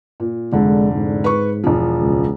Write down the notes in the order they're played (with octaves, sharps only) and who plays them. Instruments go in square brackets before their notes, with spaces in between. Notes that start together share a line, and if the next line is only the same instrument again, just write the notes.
[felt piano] A#2
[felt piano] F1 D3 [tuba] G#3
[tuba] G#2
[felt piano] B4 C#6
E1 F3
[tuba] C#2